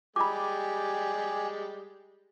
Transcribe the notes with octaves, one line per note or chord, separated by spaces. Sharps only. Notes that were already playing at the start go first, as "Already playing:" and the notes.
G3 G#3 G4 G#5 B5 D6